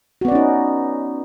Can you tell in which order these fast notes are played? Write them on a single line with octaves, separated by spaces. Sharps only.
F#4 B3 D5 C#4 D#4